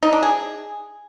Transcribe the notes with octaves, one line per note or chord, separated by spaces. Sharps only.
D#4
D4
G#4